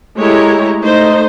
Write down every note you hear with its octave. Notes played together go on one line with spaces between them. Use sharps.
G#3 A3 E4 G4 C#5 A#5
A3 D#4 C5 D#5